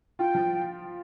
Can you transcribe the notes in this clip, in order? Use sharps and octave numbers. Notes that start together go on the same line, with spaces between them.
F4 G5
F3